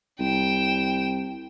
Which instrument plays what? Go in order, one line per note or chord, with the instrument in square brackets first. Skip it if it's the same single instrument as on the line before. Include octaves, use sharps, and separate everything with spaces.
[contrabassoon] C2 [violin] G5 E7